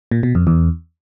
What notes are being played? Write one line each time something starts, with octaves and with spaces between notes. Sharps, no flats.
A#2
B2
F2
E2